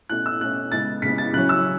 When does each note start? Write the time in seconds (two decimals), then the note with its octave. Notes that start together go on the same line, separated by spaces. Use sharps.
0.09 B2 A3 C#4 F#6
0.26 E6
0.40 B2 A3 C#4 F#6
0.72 C#3 G#3 B3 A6
1.02 C#3 G#3 B3 B6
1.18 A6
1.33 C#3 F#3 C#4 F#6
1.49 E6